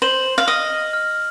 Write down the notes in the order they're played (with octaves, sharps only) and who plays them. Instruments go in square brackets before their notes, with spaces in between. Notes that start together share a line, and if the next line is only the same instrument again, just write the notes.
[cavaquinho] C5 [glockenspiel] F#7
[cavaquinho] F5
[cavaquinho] D#5 [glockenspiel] F6
[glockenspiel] F6